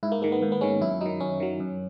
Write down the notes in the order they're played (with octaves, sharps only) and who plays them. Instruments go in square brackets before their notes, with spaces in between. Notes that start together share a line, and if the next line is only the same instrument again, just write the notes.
[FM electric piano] G#2 E4
A#3
D#3 G#3 A#3
B3
G#2 A#3
B3
D#3 G#3 C#4
F#2 E4
D#3 F#3 D#4
F#2 C#4
D#3 F#3
F#2